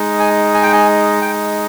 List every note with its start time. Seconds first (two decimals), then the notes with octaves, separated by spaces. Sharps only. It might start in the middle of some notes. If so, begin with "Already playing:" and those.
Already playing: G#3 D#4
0.20 G#5
0.54 G#5
0.63 G5
0.73 G#5
1.21 G5